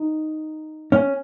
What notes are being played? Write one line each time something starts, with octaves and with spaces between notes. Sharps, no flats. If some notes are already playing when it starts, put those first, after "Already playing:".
Already playing: D#4
C#4